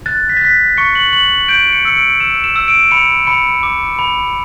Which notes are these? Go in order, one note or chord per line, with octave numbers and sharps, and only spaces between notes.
F#6 A6
B6
A6
F#6 B6
C#6 C#7
F#7
C#6 F#7
G6 D7
C#7
E6 C#7
D7
E6 E7
E7
E6
D7
B5 C#7
B5 C#7
D6
B5